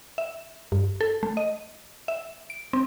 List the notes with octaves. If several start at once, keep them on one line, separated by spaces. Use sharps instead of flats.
E5
G2
A4
A3
D#5
E5
D7
C4